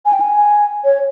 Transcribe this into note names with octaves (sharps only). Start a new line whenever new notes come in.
G#5
G5
G#5
C#5